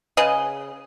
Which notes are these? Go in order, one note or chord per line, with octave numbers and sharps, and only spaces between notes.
C#3 G#4 B4 D#5